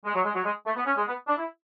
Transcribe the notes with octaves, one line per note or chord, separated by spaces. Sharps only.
G#3
F#3
G#3
F#3
G#3
A3
B3
C#4
G#3
B3
D4
E4